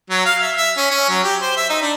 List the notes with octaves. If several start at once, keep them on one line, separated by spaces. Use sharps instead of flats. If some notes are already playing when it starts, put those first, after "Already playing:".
F#3
F5
E5
E5
C#4
C#4
F#3
G4
C5
E5
D#4
D4